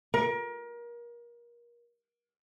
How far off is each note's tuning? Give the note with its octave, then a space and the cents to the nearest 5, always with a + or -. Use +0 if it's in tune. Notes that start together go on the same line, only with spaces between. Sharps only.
A#4 +30